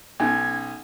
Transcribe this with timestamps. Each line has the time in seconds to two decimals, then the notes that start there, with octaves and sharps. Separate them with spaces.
0.20 B1 C#4 D#4 G#5 G#6